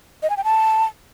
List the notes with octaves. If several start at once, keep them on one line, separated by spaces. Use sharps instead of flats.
D#5
G#5
G5
A5